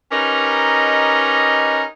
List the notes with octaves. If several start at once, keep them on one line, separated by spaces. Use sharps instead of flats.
C#4 D#4 G4 A#4 B4 D#5